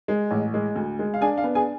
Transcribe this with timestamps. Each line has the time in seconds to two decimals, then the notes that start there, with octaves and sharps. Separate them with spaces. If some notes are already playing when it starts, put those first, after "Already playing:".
0.08 G#3
0.31 A1
0.54 G#3
0.76 D2
0.99 G#3
1.14 F5
1.21 D4 G#4 G#5
1.38 F5
1.44 B3
1.55 G#4 G#5